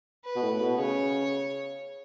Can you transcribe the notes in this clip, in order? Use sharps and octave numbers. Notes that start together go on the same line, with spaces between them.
B4
B2
A2
B2
C#3 C#5